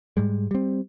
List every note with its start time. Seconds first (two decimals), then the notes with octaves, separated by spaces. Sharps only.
0.17 G#2 G3 G#3
0.51 G3 C4